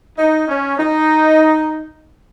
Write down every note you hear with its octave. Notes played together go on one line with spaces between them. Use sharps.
D#4
C#4
D#4